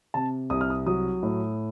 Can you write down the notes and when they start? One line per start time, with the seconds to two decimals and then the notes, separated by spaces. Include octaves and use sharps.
0.14 C3 A5
0.50 C2 D#6
0.61 F6
0.70 D#6
0.87 F#3 D#6
1.23 A2